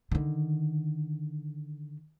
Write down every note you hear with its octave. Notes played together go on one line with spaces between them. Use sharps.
D3 D#3